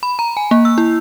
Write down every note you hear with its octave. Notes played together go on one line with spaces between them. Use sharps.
B5
A#5
G#5
A#3
E6
E4